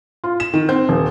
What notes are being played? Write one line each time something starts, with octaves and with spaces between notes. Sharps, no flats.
F4
E7
D#3
C4
D#1